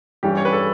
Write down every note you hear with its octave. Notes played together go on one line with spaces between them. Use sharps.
G2 E3 G3 C#4 G4
C#5
B4
A4